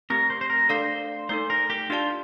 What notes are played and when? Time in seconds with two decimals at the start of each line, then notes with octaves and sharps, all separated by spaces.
0.10 A3 C4 G4 A#4
0.30 C5
0.41 C5
0.50 A#4
0.69 A3 D4 A4 C5 D5 F5
1.29 A3 D#4 A4 C5
1.50 A#4
1.70 G4
1.90 D4 F4 G4 D5 A5